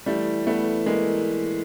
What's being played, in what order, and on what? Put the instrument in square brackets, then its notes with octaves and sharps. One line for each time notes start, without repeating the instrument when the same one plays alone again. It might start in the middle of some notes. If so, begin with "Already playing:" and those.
[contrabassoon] E3 [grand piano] G3 A3
[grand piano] A3 B3
G#3 A#3